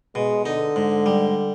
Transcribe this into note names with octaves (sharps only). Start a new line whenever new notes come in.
B2 G#3
D3 D#4
G#2
G3